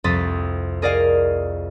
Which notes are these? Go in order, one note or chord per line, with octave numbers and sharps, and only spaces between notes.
C2 F2 C6 D#6 A6 B6
G#4 A#4 D5 D#5 F5